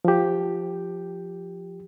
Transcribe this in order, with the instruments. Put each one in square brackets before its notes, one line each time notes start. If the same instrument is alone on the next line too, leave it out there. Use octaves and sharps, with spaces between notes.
[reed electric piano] F3 G4